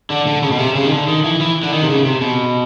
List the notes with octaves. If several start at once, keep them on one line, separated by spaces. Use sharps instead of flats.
D3
D3
C#3
B2
C3
C#3
D#3
D3
D#3
E3
E3
D3
D#3
C3
C#3
C3
B2